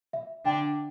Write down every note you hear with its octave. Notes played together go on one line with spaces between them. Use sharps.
E5
D3 D4 G5